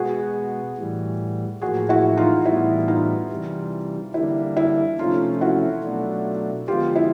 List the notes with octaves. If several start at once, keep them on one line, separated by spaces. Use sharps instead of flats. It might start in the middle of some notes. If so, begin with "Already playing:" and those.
Already playing: B2 G#3 B3 F#4 G#4
A2 E3 G3
A2 F3 A#3 F#4 G#4
E4 F#4
D#4 F4
A2 E3 G3 B3 E4
D#4 F4
C3 E3 G3
D3 G3 A#3 D4 E4
E4
C3 F3 A3 C#4 D#4 F4
E4 F#4
B2 F#3 A3 D4
D3 F3 G#3 B3 F4 G4
E4